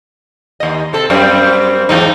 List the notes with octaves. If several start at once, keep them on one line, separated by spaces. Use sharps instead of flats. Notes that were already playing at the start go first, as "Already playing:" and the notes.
D#2 D#5
C3 A4
F#2 G3 C4
E2 G#2 D#4